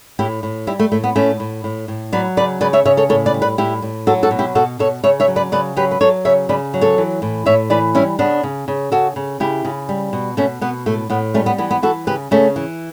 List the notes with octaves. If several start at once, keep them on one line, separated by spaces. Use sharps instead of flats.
A2 E4 G4
A2
G3 E4 G4
A3
A2 A3
B3
A2 A3 C#4
A2
A2
A2
F#3 B4 D5
C#3 B4 D5
C#3 B4 D5
C#5 E5
C#3 C#5 E5
A4 C#5
A2 A4 C#5
B4 D5
G3
B4 D5
A2 E4 G4
A2
F#3 F#4 A4
F#4 A4
B2
E4 G4
B2 F#4 A4
B2 A4 C#5
C#3 C#5 E5
C#5 E5
F#3
B4 D5
C#3 B4 D5
F#3 G4 B4
B4
F#3 A4 C#5
C#3 C#5 E5
C#3 B4 D5
F#3
A4 C#5
E3
A2
A2 C#5 E5
E3 B4 D5
G3 C#4 E4
C#3 B3 D4
C#3
C#3
C#3 F#4 A4
C#3
C#3 E4 G4
C#3
G3
B2
B2 A3 C#4
B2 B3
A2 A3
A2 B3
G3 A3 C#4
B3
E3 B3
B3
E3 F#4 A4
C#3 G4 B4
C#3 A3 C#4
E3